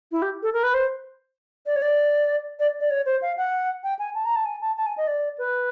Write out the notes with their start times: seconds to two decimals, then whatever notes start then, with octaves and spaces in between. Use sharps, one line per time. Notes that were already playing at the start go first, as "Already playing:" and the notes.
0.12 E4
0.22 G4
0.43 A4
0.53 A#4
0.63 B4
0.74 C5
1.66 D5
1.76 C#5
1.82 D5
2.60 D5
2.80 D5
2.90 C#5
3.06 C5
3.22 F5
3.37 F#5
3.84 G5
3.99 G#5
4.15 A5
4.25 A#5
4.36 A5
4.46 G#5
4.61 A5
4.77 A5
4.86 G#5
4.97 D#5
5.07 D5
5.38 B4